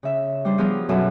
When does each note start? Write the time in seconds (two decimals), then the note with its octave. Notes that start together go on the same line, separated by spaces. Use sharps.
0.03 C#3 E5
0.45 G3 D4 C5
0.58 F3 B3 G#4 A#4
0.89 F#2 B2 F#3 A4 E5 G#5